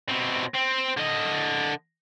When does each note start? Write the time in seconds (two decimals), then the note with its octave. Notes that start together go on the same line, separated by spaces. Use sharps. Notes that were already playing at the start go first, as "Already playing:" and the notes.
0.09 B2 C4
0.54 C4
0.98 D3 D#5